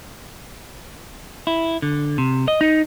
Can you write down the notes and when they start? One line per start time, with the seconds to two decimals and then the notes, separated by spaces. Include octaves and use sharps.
1.47 E4
1.82 D3
2.18 C3
2.48 D#5
2.61 D#4